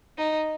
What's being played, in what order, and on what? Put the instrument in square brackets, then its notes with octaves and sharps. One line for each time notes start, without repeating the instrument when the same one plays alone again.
[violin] D#4